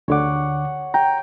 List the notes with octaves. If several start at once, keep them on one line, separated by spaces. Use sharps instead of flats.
D2 D3 C#5 F#5 D6
G5 A#5